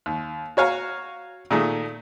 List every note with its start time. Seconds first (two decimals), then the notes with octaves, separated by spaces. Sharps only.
0.06 D#2
0.57 F#4 C#5 F5 G#5 A#5
1.51 A#2 D#3 A3 G#4